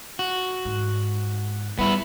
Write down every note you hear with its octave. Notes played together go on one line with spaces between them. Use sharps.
F#4
G#2
G3 B3 E4